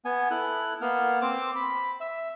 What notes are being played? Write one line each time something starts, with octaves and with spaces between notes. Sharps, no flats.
B3 G#5
E4 A4 F#6
A#3 B3 F6
C4 C5 D6
B5
E5